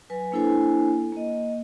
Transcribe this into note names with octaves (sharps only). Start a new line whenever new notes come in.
F#3 B4 G#5
A#3 D4 E4 A4 C5 G#5
A#3 D#5